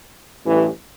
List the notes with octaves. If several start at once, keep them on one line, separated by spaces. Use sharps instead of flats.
A1 G2 E3